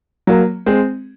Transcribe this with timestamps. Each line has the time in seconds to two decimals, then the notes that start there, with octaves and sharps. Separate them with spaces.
0.27 F#3 A#3
0.66 G#3 C4